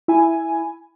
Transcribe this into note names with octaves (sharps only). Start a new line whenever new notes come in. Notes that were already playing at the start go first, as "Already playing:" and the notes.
E4 G#5